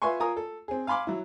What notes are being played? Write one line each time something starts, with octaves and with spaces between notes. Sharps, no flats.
F4 B4 E5 G#5 C6 C#6
F4 A#4 G#5 A#5 D#6
A4
C4 G#4
F5 G#5 B5 C6 D6
F#3 E4